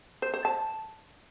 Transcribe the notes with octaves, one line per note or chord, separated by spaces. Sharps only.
C5
C5
A5